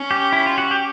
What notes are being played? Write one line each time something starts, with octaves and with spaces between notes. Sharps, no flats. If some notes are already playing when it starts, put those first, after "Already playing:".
Already playing: C#4
G4
E4
F4
F#4
G4